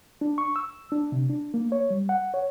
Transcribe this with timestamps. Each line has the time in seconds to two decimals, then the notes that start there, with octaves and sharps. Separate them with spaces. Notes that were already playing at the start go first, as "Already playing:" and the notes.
0.21 D4
0.38 C#6
0.56 E6
0.92 D4
1.12 C3
1.30 D4
1.54 A#3
1.72 C#5
1.90 G3
2.09 F#5
2.34 C#5